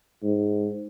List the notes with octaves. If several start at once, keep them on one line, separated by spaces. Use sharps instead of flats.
G#2